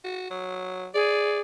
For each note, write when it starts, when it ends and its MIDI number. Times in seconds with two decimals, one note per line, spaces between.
0.04 0.29 66
0.30 0.87 54
0.94 1.40 68
0.94 1.40 74